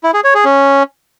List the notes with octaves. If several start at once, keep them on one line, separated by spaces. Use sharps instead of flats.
E4
G#4
C#5
G#4
C#4